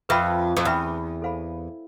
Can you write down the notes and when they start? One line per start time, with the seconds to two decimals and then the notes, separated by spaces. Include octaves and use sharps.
0.09 F2 B4 E5 G5 B5
0.57 F2
0.65 E2 B4 E5 G5 B5
1.22 A4 C5 F5 G#5 B5